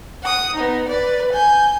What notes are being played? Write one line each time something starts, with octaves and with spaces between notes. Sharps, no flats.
F#5 D#6
B3 D#4
B4 D5
G#5 G6